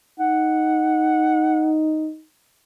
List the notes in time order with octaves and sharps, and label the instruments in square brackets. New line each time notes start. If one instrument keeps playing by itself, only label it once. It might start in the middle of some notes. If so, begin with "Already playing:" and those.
[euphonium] D#4 [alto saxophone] F#5